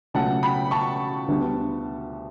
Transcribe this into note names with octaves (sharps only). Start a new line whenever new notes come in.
C#2 B2 F#3 A3 F#5 A5
G5 B5
A5 C#6
D2 D3 G3 B3